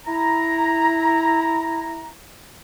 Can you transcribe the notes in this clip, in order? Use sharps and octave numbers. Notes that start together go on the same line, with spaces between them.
E4 A#5